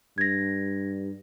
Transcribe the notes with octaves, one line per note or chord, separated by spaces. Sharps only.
G2 G#6 A#6